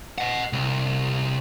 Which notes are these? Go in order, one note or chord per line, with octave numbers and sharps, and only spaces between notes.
D#5 F#5
C2